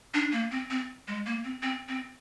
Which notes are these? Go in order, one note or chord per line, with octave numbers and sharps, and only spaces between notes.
D4
A#3
C4
C4
G#3
A#3
C4
C4
C4